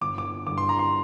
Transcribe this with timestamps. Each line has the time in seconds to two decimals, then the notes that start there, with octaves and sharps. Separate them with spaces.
0.01 G1 D6
0.18 D6
0.47 G2 D3 D6
0.58 C6
0.69 A#5
0.79 C6